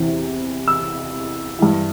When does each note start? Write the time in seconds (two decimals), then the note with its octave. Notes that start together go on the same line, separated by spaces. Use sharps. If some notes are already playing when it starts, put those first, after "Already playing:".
Already playing: E2 C3 E3
0.68 E6
1.59 G2 E3